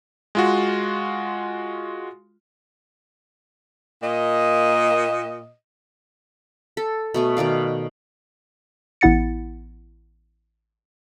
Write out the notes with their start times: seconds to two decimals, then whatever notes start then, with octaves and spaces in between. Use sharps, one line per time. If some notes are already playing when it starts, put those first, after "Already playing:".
0.35 G#3 F4 F#4
4.03 A#2 A#3 D#5
6.77 A4
7.14 B2 A3 G#5
7.37 B2 D#3 D5 F5
9.01 A1 B3 E4 F#5 A6 C#7